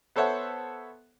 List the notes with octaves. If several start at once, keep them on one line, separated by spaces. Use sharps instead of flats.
B3 A4 C5 C#5 E5 F#5